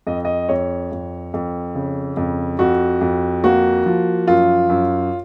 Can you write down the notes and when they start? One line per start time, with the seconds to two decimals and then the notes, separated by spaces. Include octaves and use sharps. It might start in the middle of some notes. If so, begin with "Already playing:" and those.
0.07 F2 D#5
0.25 D#5
0.49 F2 C#5
0.92 F2
1.34 F2
1.75 C#3
2.17 F2
2.59 F2 F#4
3.01 F2
3.44 A#3 F#4
3.86 F3
4.27 F#2 F4
4.70 F#2